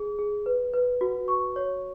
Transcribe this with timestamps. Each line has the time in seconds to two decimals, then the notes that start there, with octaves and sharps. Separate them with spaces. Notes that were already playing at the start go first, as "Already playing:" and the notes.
Already playing: G#4
0.19 G#4
0.46 B4
0.73 B4
1.01 F#4
1.28 C#6
1.56 C#5